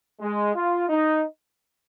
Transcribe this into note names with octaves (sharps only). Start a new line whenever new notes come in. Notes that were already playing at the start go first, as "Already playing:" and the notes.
G#3
F4
D#4